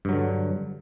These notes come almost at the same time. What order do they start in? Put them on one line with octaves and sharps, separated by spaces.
G2 F#3 D3